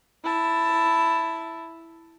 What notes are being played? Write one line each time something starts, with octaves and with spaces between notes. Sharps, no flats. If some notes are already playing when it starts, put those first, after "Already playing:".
E4 A5